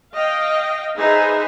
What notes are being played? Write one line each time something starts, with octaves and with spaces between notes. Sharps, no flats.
D#5 F5 G5
D#4 G#4 B4 C5 E5 G#5